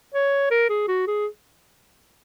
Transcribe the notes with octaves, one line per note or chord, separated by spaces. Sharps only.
C#5
A#4
G#4
F#4
G#4